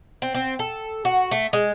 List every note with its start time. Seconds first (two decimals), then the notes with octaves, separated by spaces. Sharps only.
0.22 C4
0.34 C4
0.59 A4
1.05 F#4
1.31 A3
1.53 G#3